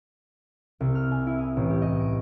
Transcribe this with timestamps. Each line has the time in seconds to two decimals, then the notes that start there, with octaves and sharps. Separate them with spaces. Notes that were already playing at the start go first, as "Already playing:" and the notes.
0.80 C2
0.95 F6
1.11 G#5
1.27 E4
1.39 D#6
1.57 A1
1.70 G4
1.82 D#5
2.01 D7